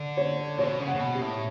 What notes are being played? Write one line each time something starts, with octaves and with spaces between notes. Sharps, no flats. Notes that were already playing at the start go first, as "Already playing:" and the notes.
Already playing: D3
C#5
B2 C#5
C#3
F#5
C#3
B2
G4
A2